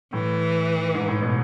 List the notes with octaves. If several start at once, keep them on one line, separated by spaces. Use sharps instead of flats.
A2 E3
G#2
A2
B2